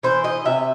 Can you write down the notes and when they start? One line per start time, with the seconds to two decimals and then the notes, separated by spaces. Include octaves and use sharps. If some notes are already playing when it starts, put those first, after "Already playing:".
0.03 E3 C5
0.24 D#5
0.45 C3 E5